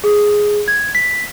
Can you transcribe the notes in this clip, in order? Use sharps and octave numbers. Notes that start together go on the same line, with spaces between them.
G#4
G#6
B6